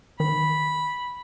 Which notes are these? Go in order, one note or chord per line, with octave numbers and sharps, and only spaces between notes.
D#3 B5